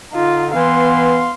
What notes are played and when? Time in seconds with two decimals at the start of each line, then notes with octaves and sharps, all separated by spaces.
0.13 D3 D#4 F4
0.55 E3 B3 F5 C6